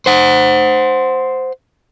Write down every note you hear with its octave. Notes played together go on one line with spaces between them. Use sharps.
C5 F#5